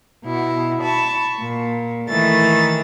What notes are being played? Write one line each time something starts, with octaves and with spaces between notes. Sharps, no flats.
B2 E4
A5 B5 C#6
A#2
D#3 E3 A3 B5 A6